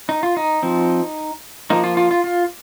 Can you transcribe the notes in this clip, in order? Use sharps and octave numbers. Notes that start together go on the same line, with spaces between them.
D#4
F4
D#4
F3 C4
F3 A#3 D#4
F4
F4
F4
F4